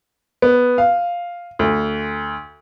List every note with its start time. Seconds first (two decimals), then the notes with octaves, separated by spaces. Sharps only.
0.42 B3
0.78 F5
1.59 D2